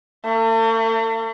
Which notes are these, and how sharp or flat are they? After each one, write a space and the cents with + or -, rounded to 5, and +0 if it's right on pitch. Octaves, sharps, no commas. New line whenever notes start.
A3 +40